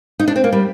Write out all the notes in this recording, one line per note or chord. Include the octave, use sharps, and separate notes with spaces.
D#4
D4
C4
A#3
G3